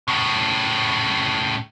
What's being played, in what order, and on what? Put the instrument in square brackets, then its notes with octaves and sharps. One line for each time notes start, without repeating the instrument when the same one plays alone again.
[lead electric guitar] A2 C#3